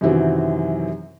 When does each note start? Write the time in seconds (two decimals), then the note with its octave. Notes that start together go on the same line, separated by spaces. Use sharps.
0.01 F#2 C3 D#3 E3 F#3 C4